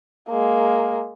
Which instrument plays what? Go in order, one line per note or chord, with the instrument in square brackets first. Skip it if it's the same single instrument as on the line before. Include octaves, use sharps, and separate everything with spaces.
[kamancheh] G#3 A#3